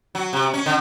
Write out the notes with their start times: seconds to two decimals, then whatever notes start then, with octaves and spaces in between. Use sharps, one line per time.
0.15 F#3
0.33 C3
0.54 C#4
0.66 D3